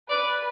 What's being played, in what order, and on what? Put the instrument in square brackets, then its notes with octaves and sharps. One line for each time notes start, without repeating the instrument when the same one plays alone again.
[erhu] B4 [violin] D5